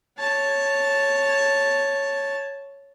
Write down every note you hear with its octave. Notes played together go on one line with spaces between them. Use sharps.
C#5 A5